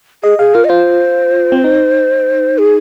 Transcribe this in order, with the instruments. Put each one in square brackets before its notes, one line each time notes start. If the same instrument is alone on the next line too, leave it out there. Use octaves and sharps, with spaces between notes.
[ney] G#4 [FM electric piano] D#5
[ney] G#4 [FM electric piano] F5
[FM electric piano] F4 [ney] A#4
[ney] D#5
[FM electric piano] F4 [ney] C5
[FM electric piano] C4
D#4
[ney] G#4